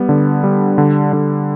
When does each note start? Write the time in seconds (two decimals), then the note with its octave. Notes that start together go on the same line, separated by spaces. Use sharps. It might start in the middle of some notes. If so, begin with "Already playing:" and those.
Already playing: G3 B3
0.09 D3
0.44 G3
0.78 D3
1.13 D3